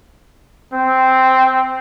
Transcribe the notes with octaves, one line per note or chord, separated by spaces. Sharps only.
C4